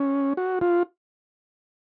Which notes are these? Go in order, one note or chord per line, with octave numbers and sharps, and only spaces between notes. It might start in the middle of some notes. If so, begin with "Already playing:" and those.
Already playing: C#4
F#4
F4